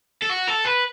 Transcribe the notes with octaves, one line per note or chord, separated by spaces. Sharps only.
A4
F#4
A4
B4